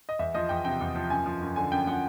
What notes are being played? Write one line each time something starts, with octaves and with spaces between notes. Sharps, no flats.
D#5
E2 E5
F3 D#5
E2 G5
C3 G5
E2
F3
F#2 G#5
F3
F#2
D3 G#5
F#2 G5
F3 F#5